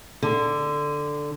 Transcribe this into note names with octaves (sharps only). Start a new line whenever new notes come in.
D3